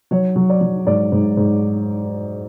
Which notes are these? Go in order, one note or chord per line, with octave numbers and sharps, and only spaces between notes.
F#3 C#5
F#3
D5
F#3
G#2 D5
G#2
G#2